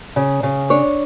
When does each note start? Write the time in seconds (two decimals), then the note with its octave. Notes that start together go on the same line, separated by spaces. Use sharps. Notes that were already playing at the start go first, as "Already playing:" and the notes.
0.16 C#3
0.43 C#3
0.70 D4 C#5